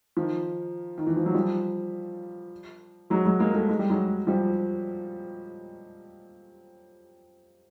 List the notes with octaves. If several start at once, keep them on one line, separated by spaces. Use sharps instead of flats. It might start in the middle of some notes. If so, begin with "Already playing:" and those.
D#3 F3
D#3
E3
F3
F#3
F3 G3
F#3 G#3
F#3 G#3
G#3 A#3
G3 A3
G#3
G3
F#3 G#3
F3 G3